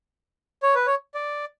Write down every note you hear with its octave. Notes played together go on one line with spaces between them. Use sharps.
C#5
B4
C#5
D5